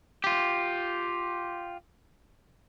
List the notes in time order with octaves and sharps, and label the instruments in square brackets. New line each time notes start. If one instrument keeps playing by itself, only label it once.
[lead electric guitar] F4 G4